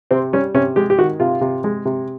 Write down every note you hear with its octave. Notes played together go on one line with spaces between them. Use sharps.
C3 C4
G3 C#4
C3 C#4
G#3 G4
G4
D#3 F#4
C3 F4
C3
G#3
C3